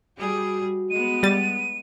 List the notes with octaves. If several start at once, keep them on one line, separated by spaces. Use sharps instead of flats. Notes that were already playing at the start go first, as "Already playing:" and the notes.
G3 F#4 G#4
G#3 B3 D#7
G3 A6